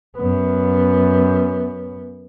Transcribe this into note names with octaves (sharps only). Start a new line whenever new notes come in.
F#2 B3